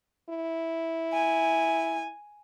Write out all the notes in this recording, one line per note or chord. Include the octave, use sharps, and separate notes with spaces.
E4
G#5